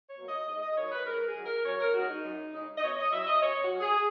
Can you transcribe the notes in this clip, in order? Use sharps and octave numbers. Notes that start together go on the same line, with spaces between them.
C#5
B2 F#3 A#3
D#5
G#2 D#5
D#5
D#3 F#3 C#5
B4
G#2 A#4
G#4
D#3 F#3
A#4
F#2 C#5
A#4
C#3 G#3 D#4 F#4
D#4
F#2
C#3 G#3 D#4
D#5
B2 C#5
D#5
F#3 C#4 E5
D#5
B2 C#5
F#4
F#3 C#4
G#4